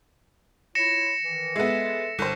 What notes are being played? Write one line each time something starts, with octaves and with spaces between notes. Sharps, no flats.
E4 F4 C#5 A#6 C#7 E7
D#3 E3
G#3 B3 A4 E5
G1 A#4 C5